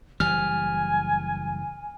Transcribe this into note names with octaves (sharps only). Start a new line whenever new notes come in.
F#1 E3 G3 G#5 F6